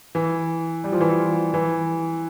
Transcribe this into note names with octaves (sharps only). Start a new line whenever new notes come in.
E3
G3
F3
E3
F3
E3